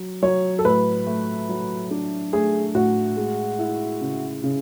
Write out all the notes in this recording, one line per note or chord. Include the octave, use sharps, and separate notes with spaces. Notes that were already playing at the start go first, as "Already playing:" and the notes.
Already playing: F#3
F#3 C#5
A4
A2 B4
A3
F#3
D4
A3 G#4
A2 F#4
G#3
E4
C#3
C#3